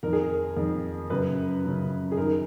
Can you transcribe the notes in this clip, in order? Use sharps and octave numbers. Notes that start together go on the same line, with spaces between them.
F2 D#3 A#4
G#4
A#4
F2 D#3
F#2 C#3 B4
F#2 C#3
G#4
F#2 D#3 A#4